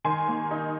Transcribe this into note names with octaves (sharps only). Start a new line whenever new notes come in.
D#3 G#5 C6
A#3
D#4